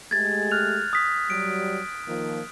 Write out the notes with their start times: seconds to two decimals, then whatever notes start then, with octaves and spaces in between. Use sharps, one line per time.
0.11 G#3 A3 G4 G#6 A6
0.51 F6 F#6 F7
0.93 D#6 B6
1.30 F#3 G3 D7
2.07 D#3 F3 A#3